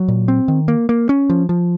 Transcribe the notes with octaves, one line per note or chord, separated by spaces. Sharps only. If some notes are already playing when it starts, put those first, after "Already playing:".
Already playing: F#3
A#2
C4
D#3
A#3
A#3
C#4
F3
F3